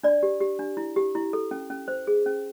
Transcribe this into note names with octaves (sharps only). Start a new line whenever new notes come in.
D4 D5
G4
G4
D4
E4
G4
E4
A4
C#4
C#4
C5
G#4
C#4